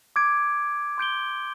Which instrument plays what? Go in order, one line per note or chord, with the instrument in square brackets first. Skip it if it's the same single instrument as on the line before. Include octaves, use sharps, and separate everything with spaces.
[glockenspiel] D6 G#6 D7
C6 G6 D7 G7